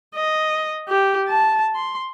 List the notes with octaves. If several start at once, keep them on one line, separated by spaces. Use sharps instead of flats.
D#5
G4
A5
C6